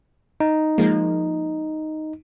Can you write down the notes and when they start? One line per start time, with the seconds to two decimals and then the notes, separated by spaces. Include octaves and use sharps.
0.40 D#4
0.78 F3 G#3 A#3